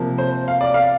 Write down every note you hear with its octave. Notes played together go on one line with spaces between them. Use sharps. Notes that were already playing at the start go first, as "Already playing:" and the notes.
Already playing: C3 F3 A#3
C5
F5
D5
F5